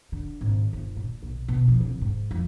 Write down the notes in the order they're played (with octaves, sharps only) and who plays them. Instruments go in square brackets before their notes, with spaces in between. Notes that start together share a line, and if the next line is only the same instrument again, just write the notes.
[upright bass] D3
G#1
G1
A#2
B1
B2
F3
C2
G#2
F2